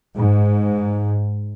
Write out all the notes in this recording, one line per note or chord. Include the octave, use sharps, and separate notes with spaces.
G#2